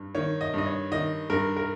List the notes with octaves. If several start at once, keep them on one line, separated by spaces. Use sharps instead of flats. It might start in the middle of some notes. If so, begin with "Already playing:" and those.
Already playing: G2
D#3 C#5
D#5
G2 D#5
C#5
D#3 D#5
G2 A#4
A#4